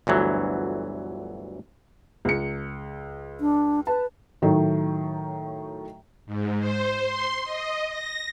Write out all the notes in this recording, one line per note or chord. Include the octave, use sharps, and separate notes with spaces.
G1 D2 E3 F#3
C#2 C#7
D4
B4 A5
A2 D#3 F#3 A3
G#2
C5
C6
D#5
A#6